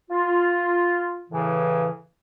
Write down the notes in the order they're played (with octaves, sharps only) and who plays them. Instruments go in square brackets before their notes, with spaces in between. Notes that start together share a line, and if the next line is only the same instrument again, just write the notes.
[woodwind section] F4
A2 C#3 E3